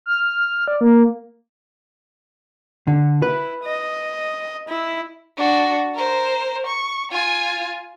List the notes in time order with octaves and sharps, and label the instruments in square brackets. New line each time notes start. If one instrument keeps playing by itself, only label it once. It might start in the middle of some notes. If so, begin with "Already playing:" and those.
[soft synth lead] F6
D5
A#3
[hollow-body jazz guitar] D3
[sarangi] E4 [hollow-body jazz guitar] B4
[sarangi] D#5
E4
[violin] D4 F#4
A#4 C5
C#6
F4 G#5